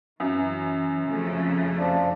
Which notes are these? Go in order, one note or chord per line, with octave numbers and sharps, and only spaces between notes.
F#2 E3
F2 C#3 A3
F3 D4